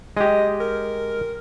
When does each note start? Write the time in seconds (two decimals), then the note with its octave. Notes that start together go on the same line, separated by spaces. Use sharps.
0.17 G#3 G4 D#5
0.60 A#4